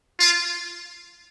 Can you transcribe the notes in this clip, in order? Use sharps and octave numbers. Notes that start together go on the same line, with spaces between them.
F4